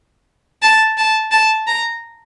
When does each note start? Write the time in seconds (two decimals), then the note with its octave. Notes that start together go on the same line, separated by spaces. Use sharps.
0.62 A5
0.97 A5
1.32 A5
1.67 A#5